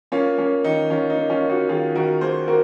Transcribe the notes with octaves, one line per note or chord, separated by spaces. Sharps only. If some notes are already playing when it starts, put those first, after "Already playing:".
A#3 C#4 F4
A#3 C#4
D#3 D#4
D#3 C#4 F4
D#4
A#3
C#4 F4
A#3
D#4 F#4
D#3 F4 G#4
D#3 F#4 A#4
A#3 G#4 C5
A#3 F#4 A#4